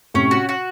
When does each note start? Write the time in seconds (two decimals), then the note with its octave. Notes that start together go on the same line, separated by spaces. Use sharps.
0.14 A2 C3 C#4
0.31 F#4
0.49 F#4